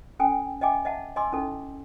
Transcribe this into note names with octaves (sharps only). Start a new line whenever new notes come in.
C#4 A4 G5 G#5
D#5 E5 G5 G#5 D6
D#5 E5 F#5 A5
D#5 G#5 C6 D6 E6
C#4 D#4 E4 A4